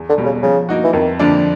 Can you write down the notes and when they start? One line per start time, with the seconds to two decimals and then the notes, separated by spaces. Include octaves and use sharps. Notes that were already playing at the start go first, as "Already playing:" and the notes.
Already playing: E2
0.09 D3
0.18 B2 G3
0.25 C#3
0.43 C#3 F3
0.69 A#3 D#4 F#4
0.84 E3
0.93 F2 D#3
1.19 D3 F3 A#3 D4